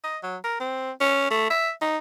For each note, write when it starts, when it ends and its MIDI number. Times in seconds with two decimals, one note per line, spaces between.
0.04 0.18 75
0.23 0.37 54
0.44 0.55 70
0.60 0.91 60
1.00 1.26 61
1.31 1.47 57
1.50 1.71 76
1.81 1.97 63